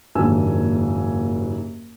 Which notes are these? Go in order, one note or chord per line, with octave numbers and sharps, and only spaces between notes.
F#1 D#2 G#2 D4 G#5 E6